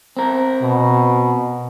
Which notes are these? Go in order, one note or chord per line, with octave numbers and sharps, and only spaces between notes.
C4 A#4
B2